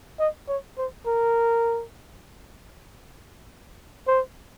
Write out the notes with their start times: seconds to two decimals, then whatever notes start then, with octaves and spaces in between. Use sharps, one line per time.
0.19 D#5
0.48 C#5
0.78 C5
1.06 A#4
4.07 C5